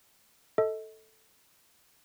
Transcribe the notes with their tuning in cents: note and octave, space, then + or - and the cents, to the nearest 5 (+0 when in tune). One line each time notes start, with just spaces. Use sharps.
A4 +0 D#5 +30